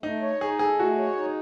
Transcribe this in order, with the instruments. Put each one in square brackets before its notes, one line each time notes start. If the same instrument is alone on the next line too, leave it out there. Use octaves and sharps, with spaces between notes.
[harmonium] A3 [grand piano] D#4
[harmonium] C#5
[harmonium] D#4 [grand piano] G#4
[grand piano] G#4 [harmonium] A4
[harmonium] A3 [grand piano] F#4
[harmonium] C#5
D#4